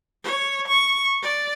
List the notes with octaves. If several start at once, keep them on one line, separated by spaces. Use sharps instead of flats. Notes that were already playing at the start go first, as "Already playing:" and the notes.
C#5
C#6
D5